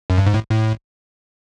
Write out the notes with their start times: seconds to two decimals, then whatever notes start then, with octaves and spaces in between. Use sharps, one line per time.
0.10 F#2
0.18 G2
0.26 G#2
0.34 A2
0.50 A2